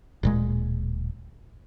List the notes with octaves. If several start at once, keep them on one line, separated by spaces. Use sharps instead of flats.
D1 A#2 G#3